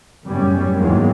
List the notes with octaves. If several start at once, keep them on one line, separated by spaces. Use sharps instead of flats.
F#1 F#2 A2 G3 B3 C#4
E2 G#2 D#3 F#3 G#3 A#3